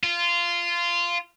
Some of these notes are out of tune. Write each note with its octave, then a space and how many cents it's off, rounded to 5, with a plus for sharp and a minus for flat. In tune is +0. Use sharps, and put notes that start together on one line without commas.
F4 -15